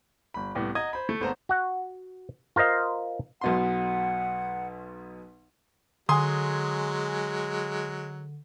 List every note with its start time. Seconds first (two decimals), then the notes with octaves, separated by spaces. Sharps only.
0.34 G1 B5
0.55 C2 A2 B3 D6
0.75 D#5 F#5 A#5 D#6 G#6
0.93 C5 B5
1.09 A3
1.20 G#1 B3 A4 C5 F#5 A#5
1.49 F#4 F#5
2.56 F4 A#4 C5 D#5 F5
3.41 B1 B2 F#5 C6
6.09 D3 F#3 G#3 G#5 C6 D#6